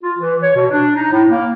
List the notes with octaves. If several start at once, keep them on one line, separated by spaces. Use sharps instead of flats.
F4
E3
C#5
B2
D4
D#4
A2
A#3